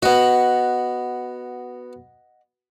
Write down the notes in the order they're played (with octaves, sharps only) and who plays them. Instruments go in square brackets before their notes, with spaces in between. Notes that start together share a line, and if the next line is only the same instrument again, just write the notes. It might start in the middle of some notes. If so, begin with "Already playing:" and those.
[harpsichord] B3 F#4 [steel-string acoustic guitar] D#5 F#5